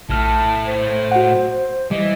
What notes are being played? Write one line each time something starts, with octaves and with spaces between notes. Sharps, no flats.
A#1 A2 A3 A5 F6
C5
F#4 F#5
E3 G3 D#5